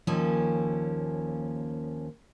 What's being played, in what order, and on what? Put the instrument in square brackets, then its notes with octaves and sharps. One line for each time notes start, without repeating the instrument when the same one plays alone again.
[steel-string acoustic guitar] D#2 F3 A#3 C#4